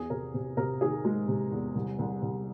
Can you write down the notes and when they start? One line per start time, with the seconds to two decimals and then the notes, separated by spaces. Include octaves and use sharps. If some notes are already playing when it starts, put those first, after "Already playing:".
Already playing: E2 G#4
0.10 C3 A#4
0.34 C3
0.57 C3 A#4
0.81 D#3 G#4
1.05 G#3
1.28 C3
1.51 E2
1.75 C2
1.99 C2
2.22 C2